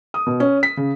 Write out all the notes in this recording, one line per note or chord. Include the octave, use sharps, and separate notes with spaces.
D#6
B2
C#4
B6
C#3